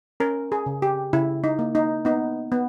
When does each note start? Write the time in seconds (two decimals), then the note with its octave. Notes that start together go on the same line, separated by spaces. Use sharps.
0.20 C#4 A#4
0.52 G#4
0.66 C#3
0.82 G4
1.13 C#3 E4
1.44 D#4
1.59 A#3
1.75 D#4
2.05 B3 D#4
2.52 B3